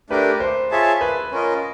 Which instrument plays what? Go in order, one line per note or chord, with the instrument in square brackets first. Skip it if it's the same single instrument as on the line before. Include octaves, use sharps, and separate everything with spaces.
[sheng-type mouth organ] A3 D4 G4 A#4 [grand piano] B4
[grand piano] C5
[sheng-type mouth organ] F4 G#4 C#5 E5 A5
[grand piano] B4
[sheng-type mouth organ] C#4 F4 A#4 D#5